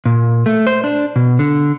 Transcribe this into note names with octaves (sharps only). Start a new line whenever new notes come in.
A#2
A3
C5
D4
B2
D3